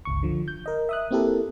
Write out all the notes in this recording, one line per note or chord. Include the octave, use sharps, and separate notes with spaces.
G1 C#2 C#6
D3 F3
G6
A#4 D#5
E5 D#6 F#6
A#3 C4 E4 G4 A4 A#4